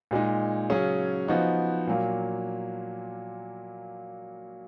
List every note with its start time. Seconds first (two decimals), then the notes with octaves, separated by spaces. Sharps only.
0.11 A#2 G#3 D#4
0.70 C#3 F#3 C#4 G#4
1.28 F3 B3 D#4 F#4
1.87 A#2 F#3 A#3